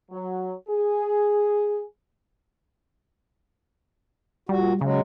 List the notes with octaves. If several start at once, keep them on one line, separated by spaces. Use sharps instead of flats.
F#3
G#4
A#2 G3 F#4
C#3 F#3 G#3